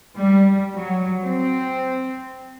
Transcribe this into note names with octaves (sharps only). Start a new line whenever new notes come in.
G3
F#3
C4